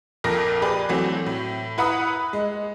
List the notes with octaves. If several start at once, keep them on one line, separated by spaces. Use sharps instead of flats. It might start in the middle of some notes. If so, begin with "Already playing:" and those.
A#1 F2 A#2 A4 A#4 A#6
G4 G#4 B4 D5
E3 F#3 A3 C4
A2
E4 B4 F#5 A#5 B5 D#6
G#3